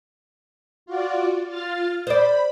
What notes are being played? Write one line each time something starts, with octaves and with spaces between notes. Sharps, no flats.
F4 F#4 D5
F4 F6 A6
C5 D5 B5